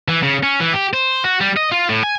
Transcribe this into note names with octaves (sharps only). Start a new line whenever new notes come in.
E3
C#3
C#4
E3
G4
C5
F#4
G3
D#5
F4
A2
G#5